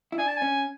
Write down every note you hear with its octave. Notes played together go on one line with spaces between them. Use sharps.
E4
D4 G#5
A5
G#5
C#4